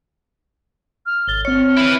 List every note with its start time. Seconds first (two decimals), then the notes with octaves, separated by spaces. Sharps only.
1.06 F6
1.28 G#1 A6 G7
1.45 C4 C#5 F6 C#7
1.77 E4 B4